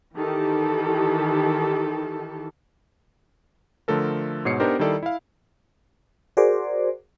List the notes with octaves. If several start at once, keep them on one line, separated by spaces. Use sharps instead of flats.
D#3 E3 G4 A4
D3 F3 A3 A4 A#4
G#2 B2 C#5 C7 C#7
B3 D4 D#4 G4 A#4 C5
D#3 G3 E4 A4 D5
E4 F5
F#4 G#4 A#4 C5 D5